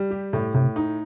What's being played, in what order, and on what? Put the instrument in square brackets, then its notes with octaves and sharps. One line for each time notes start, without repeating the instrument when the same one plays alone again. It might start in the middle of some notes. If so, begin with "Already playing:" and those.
Already playing: [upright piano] G3
G4
A2
[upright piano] A2 [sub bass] C3
[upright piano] D#4